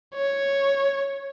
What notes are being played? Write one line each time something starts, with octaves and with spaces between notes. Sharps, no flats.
C#5